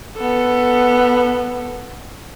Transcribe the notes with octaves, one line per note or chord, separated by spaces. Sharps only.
B3 A4